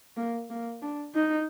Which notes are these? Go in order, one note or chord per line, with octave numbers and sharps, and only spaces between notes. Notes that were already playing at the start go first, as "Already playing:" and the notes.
A#3
A#3
D4
D#4